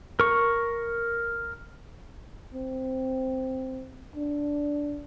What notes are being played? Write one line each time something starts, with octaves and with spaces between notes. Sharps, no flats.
A#4 C#6
C4
D4